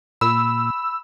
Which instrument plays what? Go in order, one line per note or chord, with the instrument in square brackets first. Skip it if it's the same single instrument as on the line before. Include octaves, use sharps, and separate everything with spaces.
[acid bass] A#2 [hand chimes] B5 [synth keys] E6